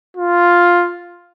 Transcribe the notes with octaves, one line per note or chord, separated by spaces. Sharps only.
F4